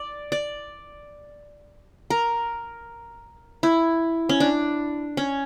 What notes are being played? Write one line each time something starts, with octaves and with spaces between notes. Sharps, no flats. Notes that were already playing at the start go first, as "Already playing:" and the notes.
Already playing: D5
D5
A#4
E4
C#4
D4
C#4